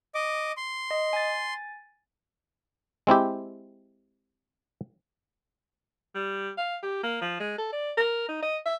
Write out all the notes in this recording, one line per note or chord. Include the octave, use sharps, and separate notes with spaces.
D#5 D6
C6
D#5
G#5 A6
G#3 C4 E4 G4
G3
F5
G4
A#3
F3
G#3
A4
D5
A#4
D#4
D#5
E5